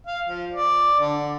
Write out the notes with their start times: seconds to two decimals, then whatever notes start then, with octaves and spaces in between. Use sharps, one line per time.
0.07 F5
0.27 F3
0.52 D5
0.99 D3